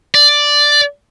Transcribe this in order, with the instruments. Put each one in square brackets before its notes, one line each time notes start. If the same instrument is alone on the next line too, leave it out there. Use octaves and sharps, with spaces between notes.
[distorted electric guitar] D5